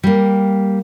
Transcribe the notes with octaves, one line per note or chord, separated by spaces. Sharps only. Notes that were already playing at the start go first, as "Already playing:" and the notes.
G3 A#3